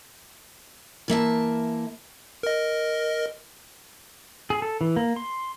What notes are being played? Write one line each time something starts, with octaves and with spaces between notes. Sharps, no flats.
E3 A#3 E5 A5
A#4 D#5
G#4
A4
E3
A#3
C6